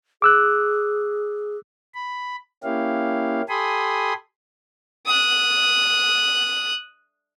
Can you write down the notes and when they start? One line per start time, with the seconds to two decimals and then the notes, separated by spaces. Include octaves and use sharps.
0.22 G#4 D6 E6 F#6
1.94 B5
2.64 A#3 C#4 E4 G4 F5
3.49 G4 A4 G#5 B5 C6 D#6
5.06 D#6 F#6